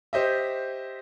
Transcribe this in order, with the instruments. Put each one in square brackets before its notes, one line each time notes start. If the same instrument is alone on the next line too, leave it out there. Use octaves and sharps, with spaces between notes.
[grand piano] G4 C5 D#5 E5